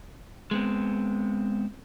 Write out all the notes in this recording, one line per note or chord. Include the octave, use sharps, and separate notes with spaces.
G#3 B3 C4